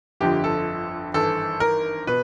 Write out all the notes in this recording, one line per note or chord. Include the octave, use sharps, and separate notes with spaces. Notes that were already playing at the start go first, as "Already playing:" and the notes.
G1 F2 D3 F3 G4
A4
G#1 G2 E3 A4
A#4
B2 B4